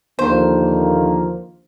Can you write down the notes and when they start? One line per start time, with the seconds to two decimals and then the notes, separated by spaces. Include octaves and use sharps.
0.19 D#2 D3 F3 A#3 C5